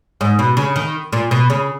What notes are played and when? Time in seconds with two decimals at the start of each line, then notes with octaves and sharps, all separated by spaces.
0.21 G#2
0.39 B2
0.57 C#3
0.76 D#3
1.13 A#2
1.31 B2
1.50 C#3